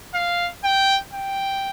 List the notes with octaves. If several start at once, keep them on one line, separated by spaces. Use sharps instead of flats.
F5
G5
G5